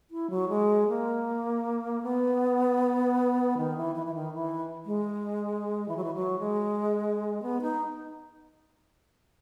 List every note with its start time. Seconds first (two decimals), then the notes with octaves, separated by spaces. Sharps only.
0.11 E4
0.30 F#3
0.49 G#3
0.88 A#3
2.03 B3
3.58 D#3
3.77 E3
3.96 E3
4.06 E3
4.15 D#3
4.34 E3
4.86 G#3
5.88 E3
5.97 F#3
6.04 E3
6.14 F#3
6.39 G#3
7.42 B3
7.61 D#4